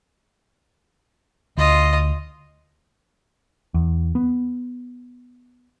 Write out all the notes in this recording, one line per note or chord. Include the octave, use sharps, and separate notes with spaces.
D2 F4 D#5
E2
B3